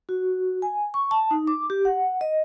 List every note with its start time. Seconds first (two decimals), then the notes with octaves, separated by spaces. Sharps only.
0.09 F#4
0.62 G#5
0.94 C#6
1.11 A5
1.31 D#4
1.47 D6
1.70 G4
1.85 F#5
2.21 D#5